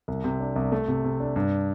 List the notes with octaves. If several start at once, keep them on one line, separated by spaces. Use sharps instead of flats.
C2
C3
D4
C2
A3
C3
C3
D4
G2